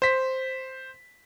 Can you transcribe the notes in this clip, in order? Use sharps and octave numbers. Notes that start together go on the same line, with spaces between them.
C5 B6